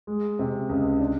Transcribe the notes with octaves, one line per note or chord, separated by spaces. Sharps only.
G#3
C3
C#2
D4